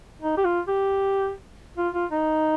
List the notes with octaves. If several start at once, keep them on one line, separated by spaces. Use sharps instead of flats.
D#4
G4
F4
G4
F4
F4
D#4